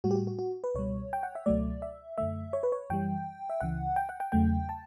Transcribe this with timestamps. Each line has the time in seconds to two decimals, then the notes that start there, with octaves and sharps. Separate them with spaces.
0.04 A2 G3 F#4
0.11 G4
0.15 F#4
0.27 F#4
0.39 F#4
0.64 B4
0.75 C#2 B2 G3 C#5
1.13 G5
1.23 F#5
1.35 E5
1.46 C#2 B2 F#3 A3 D5
1.82 E5
2.18 F#2 D3 A3 E5
2.53 C#5
2.63 B4
2.72 C#5
2.90 F#2 E3 G3 G5
3.50 E5
3.60 C#2 C#3 E3 F#5
3.96 G5
4.09 F#5
4.20 G5
4.32 E2 C#3 F#3 A3 G5
4.69 A5